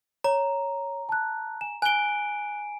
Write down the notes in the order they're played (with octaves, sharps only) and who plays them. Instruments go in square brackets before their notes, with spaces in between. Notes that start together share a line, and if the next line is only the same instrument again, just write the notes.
[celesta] C#5 [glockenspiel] A#5
[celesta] A5 F#6
G#5 E7
[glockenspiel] G#5 D7 [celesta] F#6 G7